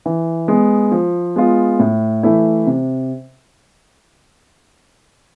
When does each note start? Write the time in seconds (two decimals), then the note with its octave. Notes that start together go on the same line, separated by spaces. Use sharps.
0.06 E3
0.48 G#3 B3
0.92 F3
1.36 G#3 B3 F4
1.79 A2
2.23 E3 A3 E4
2.66 C3